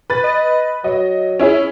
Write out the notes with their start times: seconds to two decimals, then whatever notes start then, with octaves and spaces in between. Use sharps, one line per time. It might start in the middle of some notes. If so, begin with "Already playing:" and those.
0.10 B4 A6
0.24 D#5
0.84 F#3 D#5
1.39 C#4 E4 G#4